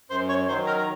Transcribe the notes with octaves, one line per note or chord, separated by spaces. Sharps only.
F#2 C5 C6
C#5 C#6
D#3 F#3 C5 C6
A#4 A#5
A#5